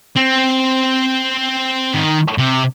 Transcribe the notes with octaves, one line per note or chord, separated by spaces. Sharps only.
C4
D#3
C3